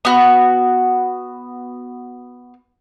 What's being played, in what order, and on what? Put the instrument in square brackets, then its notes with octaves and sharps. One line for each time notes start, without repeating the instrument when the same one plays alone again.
[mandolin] B3 F#4